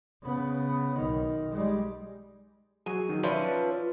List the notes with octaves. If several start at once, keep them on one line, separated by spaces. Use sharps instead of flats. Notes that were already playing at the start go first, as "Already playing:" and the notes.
C#3 B3
B1 D#3
G3 G#3
F#3 F#4 G#4 G#5
D#3 F#3 D#4
F3 C#4 B4 D5 E5 B5
F4